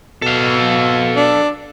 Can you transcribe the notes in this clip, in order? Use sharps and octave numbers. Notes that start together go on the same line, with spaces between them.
B2 A4 F5
D4